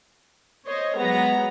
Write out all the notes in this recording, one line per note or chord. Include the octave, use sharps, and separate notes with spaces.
C5 C#5 D#5
F#3 G#3 B3 A#5